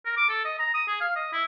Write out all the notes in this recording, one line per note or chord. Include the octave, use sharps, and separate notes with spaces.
A#4
D6
A4
D#5
A#5
D#6
G#4
F5
D#5
E4